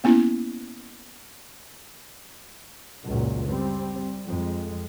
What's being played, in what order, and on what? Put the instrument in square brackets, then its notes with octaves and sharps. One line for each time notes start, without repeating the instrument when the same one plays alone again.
[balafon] A#3 B3 C#4 E4
[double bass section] C#2 F#2 A#2 F#3
G3 C4
F2 G#3